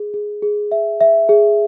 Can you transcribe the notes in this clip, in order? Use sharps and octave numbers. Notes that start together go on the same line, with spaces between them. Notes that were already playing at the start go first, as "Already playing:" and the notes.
Already playing: G#4
G#4
G#4
E5
E5
G#4